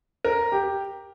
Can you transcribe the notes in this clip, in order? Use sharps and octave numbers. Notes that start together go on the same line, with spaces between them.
A#4
G4